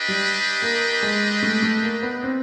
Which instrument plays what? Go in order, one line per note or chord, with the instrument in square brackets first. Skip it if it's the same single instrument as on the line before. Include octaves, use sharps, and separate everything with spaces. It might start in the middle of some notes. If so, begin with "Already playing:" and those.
Already playing: [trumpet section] D4 G4 B4 D#5 G5
[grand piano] G3
A#3
G#3
A3
A3
A#3
B3
C4